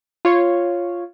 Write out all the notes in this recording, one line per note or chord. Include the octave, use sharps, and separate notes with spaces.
F4 C#5